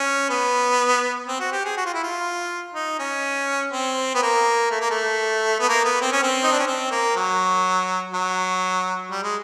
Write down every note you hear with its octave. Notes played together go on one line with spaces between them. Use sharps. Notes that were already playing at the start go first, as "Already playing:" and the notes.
Already playing: C#4
B3
C4
F#4
G4
G#4
F#4
F4
E4
F4
D#4
C#4
C4
B3
A#3
A3
A#3
A3
B3
A#3
B3
C4
C#4
C4
D#4
D4
C#4
C4
A#3
F#3
F#3
G3
G#3